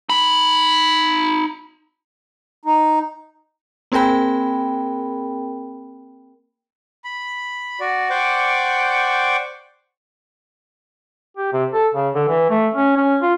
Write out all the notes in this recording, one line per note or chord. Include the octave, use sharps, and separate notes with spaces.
D#4 B5
D#4
A#3 C4 G#4 A#4 G5 B5
B5
F#4 D5
C5 D5 F#5 G5 C#6 D6
G4
C3
A4
C#3
D3
E3
A3
C#4
C#4
F4